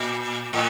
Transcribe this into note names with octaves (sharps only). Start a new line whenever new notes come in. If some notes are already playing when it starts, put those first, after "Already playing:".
Already playing: A#2
A2